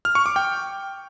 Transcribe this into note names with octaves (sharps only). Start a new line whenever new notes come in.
F6
C#6
D6
G5